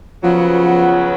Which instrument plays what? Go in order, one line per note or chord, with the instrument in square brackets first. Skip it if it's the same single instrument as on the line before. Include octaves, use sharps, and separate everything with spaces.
[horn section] C#3 F#3 B3 [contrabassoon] F3